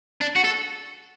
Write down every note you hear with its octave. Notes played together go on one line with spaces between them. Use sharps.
D4
F#4
A4